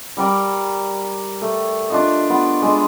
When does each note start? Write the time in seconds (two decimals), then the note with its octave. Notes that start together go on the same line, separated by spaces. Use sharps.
0.17 G3 A#4 D5 A#5
1.42 A3
1.90 D4 F4 D#5
2.30 B3 F4
2.62 G#3 D4